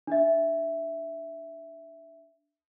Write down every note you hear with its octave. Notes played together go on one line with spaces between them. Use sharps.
D4 E5